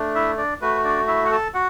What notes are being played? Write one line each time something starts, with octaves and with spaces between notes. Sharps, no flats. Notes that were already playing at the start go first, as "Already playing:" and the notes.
Already playing: A3 D4
E4 E5
D4 D5
A3 F#4 B4
D4 D5
E4 E5
F#5
A4 A5
F#4 F#5